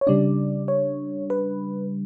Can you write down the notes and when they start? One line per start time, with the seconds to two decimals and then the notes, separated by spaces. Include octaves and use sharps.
0.01 C#5
0.07 C#3 G3 D4 D5
0.68 C#5
1.30 B4